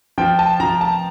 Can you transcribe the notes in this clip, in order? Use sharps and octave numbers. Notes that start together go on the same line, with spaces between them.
F3 G5
A5
F3 A#5
A5